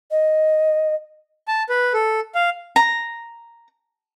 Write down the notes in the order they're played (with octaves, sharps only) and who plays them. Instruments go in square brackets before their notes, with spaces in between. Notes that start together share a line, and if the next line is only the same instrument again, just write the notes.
[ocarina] D#5
[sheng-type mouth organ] A5
B4
A4
F5
[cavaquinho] A#5